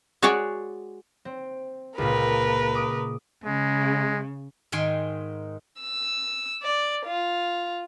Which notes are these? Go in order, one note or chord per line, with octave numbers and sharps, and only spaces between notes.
G#3 F#4 C#5 D5 F#5
C4
C#2 A#2 A#4 B4
D6 D#6
C#3 G#3
G#2 D#3 G5 G#5 C6
E6
D5
F4